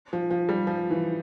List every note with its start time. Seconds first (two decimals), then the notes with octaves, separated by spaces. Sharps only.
0.13 F3
0.31 F3
0.49 G3
0.67 F3
0.91 E3